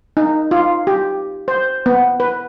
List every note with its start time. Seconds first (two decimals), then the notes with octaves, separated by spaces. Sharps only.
0.17 D#4
0.51 F4
0.87 G4
1.48 C5
1.86 B3
2.20 B4